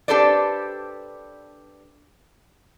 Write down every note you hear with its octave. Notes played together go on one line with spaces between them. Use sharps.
D4 G4 A4 B4 C5 D5